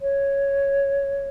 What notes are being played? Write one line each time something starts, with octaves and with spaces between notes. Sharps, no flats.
C#5